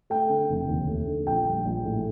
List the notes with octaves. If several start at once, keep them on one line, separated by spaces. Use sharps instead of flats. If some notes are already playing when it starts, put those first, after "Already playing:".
A3 G5
D3
F1
D#2
A3
D3
A#1 G5
G3
A#1
A2